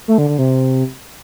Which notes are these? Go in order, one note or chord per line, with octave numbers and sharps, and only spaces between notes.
A3
D3
D3
C3